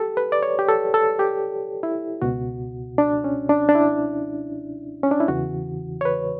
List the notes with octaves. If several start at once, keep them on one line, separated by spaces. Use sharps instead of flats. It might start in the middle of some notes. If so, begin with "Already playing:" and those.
Already playing: G4 A4
B4
D5
C#5
G4
A4
A4
G4
E4
C#2 B2 F#4
D4
C#4
D4
D4
E4
C#4
D4
E4
E2 C#3 E3 F#4
C#5
B4